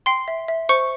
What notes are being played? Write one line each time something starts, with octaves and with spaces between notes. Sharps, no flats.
G5 C6 C7
E5
E5
C5 C#6 C#7